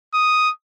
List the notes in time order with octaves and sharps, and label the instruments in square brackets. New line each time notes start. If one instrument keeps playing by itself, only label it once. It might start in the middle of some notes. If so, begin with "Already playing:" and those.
[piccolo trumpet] D#6